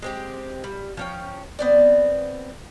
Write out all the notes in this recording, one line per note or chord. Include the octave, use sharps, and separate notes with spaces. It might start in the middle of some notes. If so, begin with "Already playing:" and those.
G#3 C4 G4
G3
F3 C#4 G5
B3 C4 D5